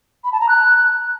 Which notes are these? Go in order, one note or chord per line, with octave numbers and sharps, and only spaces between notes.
B5
A5
A#5
F#6